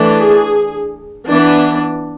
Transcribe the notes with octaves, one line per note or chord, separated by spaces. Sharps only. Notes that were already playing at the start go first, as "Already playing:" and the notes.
Already playing: E3 A3 D4
G#4
E3 B3 D4